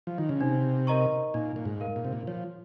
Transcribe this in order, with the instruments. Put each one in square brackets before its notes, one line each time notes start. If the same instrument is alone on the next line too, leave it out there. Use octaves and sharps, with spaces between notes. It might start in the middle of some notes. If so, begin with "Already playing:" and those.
[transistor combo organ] F3
D#3
C#3
[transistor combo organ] C3 [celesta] D#4
[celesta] A#4 D#5 A#5 C#6
[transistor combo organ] A#2 [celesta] D#4
[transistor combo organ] A#2
G#2
[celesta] A#4 F5
[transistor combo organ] A#2
C3
A#2
[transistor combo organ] F3 [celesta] C#5